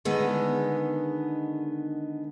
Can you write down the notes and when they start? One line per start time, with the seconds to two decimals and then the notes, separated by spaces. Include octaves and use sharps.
0.05 D3 D#3 G#3 B3